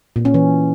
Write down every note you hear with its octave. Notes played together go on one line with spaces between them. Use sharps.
A#2
C#4
E3